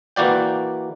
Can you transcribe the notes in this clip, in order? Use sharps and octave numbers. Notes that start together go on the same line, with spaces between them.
E3 A#3 F#4 D5 G5